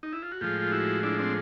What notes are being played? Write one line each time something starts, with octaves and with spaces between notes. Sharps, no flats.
D#4
E4
F4
F#4
A2 F3 G#3 F4 G4
F4
E4 F#4
D4 E4
C4 D4